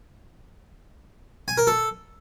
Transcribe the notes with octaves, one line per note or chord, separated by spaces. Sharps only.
G#5
A#4
A4